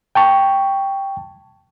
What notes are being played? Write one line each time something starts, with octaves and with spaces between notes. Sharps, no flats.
G5 A5 C#6